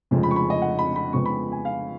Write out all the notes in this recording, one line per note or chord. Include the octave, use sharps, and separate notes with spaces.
F1 F2 C#3 F3 G#3
B5
C#6
B5
D#5
F#5
B5
B5
F2 C#3 G#3 B3 C#6
B5
G#5
F5